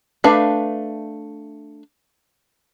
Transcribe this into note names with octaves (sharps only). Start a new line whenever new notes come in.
A3 D4 B4 E5 F5